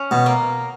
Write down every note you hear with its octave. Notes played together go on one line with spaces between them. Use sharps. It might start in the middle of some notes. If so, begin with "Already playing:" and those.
Already playing: C#4
B2
A#3